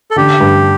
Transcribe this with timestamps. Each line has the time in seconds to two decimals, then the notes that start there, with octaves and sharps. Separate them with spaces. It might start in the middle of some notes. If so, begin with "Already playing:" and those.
0.11 A4
0.16 D3 G4
0.40 G2